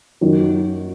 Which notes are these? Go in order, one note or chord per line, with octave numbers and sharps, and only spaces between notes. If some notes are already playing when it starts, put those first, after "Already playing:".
F#2 D#3 F#3